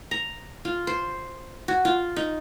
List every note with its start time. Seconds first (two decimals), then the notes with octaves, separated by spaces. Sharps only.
0.11 A#5
0.65 F4
0.87 C5
1.68 F#4
1.85 F4
2.16 D#4